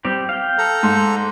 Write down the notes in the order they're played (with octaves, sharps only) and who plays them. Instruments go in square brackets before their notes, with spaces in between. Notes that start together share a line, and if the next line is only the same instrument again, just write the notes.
[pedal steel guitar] G3 C4 G4
F5 G5
[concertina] A4 A#5
[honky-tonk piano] G#2